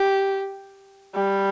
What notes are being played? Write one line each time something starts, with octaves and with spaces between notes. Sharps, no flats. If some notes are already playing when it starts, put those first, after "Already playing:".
Already playing: G4
G3